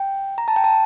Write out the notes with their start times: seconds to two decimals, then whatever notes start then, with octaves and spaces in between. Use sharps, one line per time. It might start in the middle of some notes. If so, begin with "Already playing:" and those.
Already playing: G5
0.38 A#5
0.48 A5
0.56 G5
0.64 A5